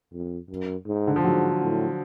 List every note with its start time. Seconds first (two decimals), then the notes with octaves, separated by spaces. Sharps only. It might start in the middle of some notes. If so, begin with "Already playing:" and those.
0.12 F2
0.50 F#2
0.86 G#2
1.07 D3
1.16 F3
1.24 G#2 F#3
1.61 A2